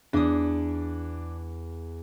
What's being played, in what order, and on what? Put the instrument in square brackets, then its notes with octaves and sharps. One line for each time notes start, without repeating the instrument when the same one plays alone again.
[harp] E2 D#6 [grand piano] D4